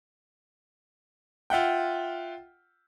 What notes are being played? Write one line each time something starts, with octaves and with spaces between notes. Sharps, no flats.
F4 E5 F#5 G5